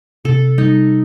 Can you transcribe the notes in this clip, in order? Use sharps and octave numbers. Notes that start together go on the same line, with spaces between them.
C3 A4
G3 D#4